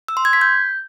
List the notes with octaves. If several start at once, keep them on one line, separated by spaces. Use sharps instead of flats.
E6
C6
G#6
B6
G6